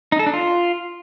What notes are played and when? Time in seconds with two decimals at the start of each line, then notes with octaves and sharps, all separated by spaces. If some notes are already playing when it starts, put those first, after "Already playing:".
0.12 D#4
0.19 A4
0.26 D4
0.33 F4